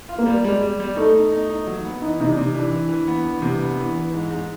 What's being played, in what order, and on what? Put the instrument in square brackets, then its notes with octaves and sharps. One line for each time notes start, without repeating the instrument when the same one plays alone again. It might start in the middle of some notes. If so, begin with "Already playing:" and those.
[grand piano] F4
[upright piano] A#3
[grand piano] G3
[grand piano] G3 [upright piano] G#3
[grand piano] G3
G3
[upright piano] A3 [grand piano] D#4
[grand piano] D#4
D#4
D#4
F#3
B3
[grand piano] E3 [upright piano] D#4
[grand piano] C3 [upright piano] D#4
[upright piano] D4
[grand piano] C3 [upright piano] D#4
[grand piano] E3 [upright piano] D4
[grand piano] E3
E3
B3
E3
C3
B3
E3
E3
G#2
G#2